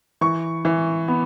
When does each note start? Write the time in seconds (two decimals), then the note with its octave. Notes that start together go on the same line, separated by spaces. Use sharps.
0.21 E3 C#6
0.65 E3
1.08 B3